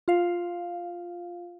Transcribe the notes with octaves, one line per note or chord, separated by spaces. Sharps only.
F4 F5